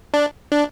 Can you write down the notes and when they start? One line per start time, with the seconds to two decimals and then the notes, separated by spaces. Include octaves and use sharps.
0.14 D4
0.52 D4